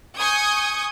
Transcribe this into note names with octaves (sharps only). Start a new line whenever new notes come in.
G#5 C#6 D#6 G6 G#6